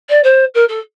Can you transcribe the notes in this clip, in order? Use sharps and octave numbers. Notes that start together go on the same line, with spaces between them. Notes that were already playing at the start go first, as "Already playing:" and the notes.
D5
C5
A#4
A4